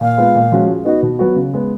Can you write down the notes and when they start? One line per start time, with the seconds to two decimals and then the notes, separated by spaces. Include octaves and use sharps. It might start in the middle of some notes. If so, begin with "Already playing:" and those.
0.01 A#2 F5
0.18 G#3 B3 F4
0.35 A#2
0.52 F3 G#3 C#4 F#4
0.68 G#3
0.85 B3 D#4 F#4 D#5
1.03 B2
1.19 F#3 B3 F#4
1.36 C#3
1.54 G#3 B3